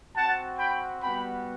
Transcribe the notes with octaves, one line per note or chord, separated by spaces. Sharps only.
C4 F#4 F#5 A5
G5 B5
G3 B3 F#4 G5 B5